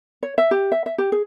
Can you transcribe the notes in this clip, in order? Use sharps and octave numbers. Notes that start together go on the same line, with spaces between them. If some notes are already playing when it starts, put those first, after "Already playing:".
C#5
E5
G4
E5
E5
G4
G#4